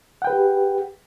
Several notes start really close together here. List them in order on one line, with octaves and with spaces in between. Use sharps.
F#5 G5 B4 G#4 G4